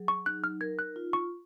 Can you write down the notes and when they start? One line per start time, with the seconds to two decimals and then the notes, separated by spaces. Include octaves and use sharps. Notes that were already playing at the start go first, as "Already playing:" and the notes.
Already playing: F#3 G#4
0.08 C#6
0.26 D#4 F#6
0.44 F6
0.61 A#4 G#6
0.79 F#6
0.96 F4
1.13 C#6